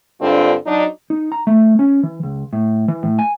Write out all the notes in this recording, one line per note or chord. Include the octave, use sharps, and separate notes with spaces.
G2 D3 G#3 C4 D4 F4
F#3 D4 D#4
D#4
A#5
A3
C#4
E3
C#2
A2
E3
A2
G#5